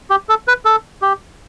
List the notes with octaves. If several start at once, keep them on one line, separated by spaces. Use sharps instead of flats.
G4
A4
B4
A4
G4